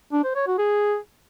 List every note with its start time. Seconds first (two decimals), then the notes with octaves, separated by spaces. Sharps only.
0.13 D4
0.24 C5
0.35 C#5
0.47 F#4
0.58 G#4